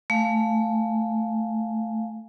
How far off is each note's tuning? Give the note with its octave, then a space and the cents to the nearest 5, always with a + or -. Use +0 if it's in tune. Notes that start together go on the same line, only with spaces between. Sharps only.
A3 +0 F5 +0 G#5 +0